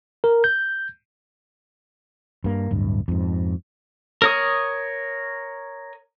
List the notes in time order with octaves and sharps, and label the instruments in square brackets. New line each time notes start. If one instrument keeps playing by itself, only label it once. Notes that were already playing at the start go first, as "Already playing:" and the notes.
[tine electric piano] A#4
G6
[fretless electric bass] G2 A#3
D1 G2
F2 G#2
[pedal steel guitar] A#4 C#5 D#6